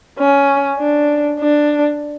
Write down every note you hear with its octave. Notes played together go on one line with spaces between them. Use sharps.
C#4
D4
D4